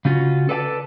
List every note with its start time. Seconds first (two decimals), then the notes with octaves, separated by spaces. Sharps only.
0.05 C#3 C#4 F4 F#4
0.49 A4 B4 D5 F#5 A5